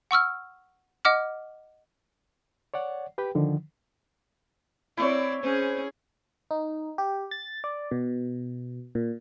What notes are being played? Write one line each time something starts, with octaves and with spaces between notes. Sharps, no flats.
F#5 C#6 E6 F6
D#5 F#5 D6 F6
C#5 D5 F#5
G4 B4 G5
D3 D#3 F3
C4 E4 C#5 D5
C#4 G#4 C5
D#4
G4
A6
D5
B2
A#2